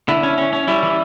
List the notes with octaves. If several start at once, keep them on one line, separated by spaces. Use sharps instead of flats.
D3 E4
C#4
C#4
C#4
G3 E4
E3